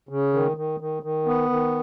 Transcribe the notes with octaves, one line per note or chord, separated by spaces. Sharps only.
C#3
D#3
D#3
D#3
D#3
B3
D#3